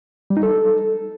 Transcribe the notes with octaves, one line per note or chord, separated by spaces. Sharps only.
G3
D#4
A4